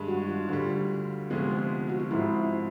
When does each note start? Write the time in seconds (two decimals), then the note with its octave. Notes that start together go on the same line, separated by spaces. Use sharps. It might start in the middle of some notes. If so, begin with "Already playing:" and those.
Already playing: G2 D#3 G#3
0.08 F#4
0.29 F4
0.49 D2 D3 G3 F4
1.30 D2 C3 F3 G#3 B3 F4
1.89 F#4
2.00 F4
2.11 G#2 F3 G#3 C4 E4